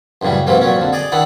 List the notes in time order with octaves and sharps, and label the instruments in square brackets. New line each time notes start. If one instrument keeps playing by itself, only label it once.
[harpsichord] A1 F#2 A2 C#3 G3
G#2 C3 E3 F#3 A#3
A#2 F#3 C#4
F2 D3
G#4 D5 D#5
D#3 D4 E4 F#5